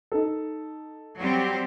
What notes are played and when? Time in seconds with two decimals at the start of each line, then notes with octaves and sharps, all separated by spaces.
0.12 D#4 A4
1.18 F#3 G3 C4